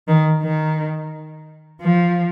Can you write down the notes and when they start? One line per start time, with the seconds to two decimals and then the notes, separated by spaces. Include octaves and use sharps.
0.08 D#3
0.43 D#3
1.81 F3